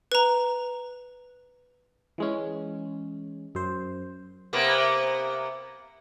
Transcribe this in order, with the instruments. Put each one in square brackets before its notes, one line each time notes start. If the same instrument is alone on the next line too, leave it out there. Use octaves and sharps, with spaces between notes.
[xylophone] B4 A#5
[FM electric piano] E3 G#3 C#4
F#2 C5
[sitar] C3 A#3 B3